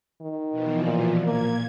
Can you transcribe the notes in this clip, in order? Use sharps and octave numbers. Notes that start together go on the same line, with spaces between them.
D#3
B2 E3 F3
A#2
A#2 A#3 G#6